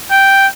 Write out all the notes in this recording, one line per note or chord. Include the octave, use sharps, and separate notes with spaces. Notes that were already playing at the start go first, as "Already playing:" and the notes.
G5